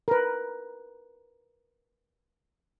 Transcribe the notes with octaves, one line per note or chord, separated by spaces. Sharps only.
A#4 B4